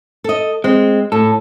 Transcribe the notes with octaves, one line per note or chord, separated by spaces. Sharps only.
A4 D#5
G#3 C4
A2 A4